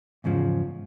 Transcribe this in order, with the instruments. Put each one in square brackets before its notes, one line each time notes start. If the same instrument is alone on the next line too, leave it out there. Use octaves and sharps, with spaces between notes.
[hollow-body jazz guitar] E2 G#2 C#3 F3